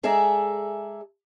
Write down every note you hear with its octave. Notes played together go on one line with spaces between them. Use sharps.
G#3 G#4 A4 D5 E5 A#5